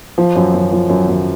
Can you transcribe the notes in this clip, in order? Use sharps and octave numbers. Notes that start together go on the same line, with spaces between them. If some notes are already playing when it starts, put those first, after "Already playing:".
F3
F#2
F#2
F3
F#2
F#2